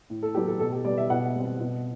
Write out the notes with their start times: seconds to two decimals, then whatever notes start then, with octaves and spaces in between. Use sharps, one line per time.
0.10 A2
0.23 A4
0.35 F#3 B3 G4
0.47 A4
0.60 B2 A4
0.72 G4
0.85 G3 B3 D5
0.98 E5
1.10 B2 F#5
1.36 G3 C4
1.61 B2